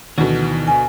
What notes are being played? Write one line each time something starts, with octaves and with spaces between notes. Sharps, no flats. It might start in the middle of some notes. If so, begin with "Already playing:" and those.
D2 B2 D#3 E3 F#4
G#5